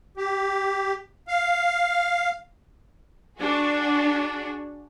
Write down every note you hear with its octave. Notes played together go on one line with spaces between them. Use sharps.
G4
F5
D4 F#4 G#4